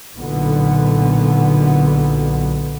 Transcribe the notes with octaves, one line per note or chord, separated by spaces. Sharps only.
B1 A#2 D3 B3